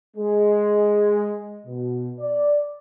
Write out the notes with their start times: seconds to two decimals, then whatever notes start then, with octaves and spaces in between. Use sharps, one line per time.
0.17 G#3
1.66 B2
2.20 D5